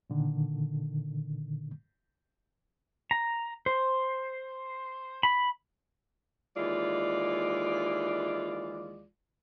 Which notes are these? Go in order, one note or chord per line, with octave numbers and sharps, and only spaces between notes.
A#2 D3 D#3
A#5
C5
B5
D#2 E3 G#3 F4 D5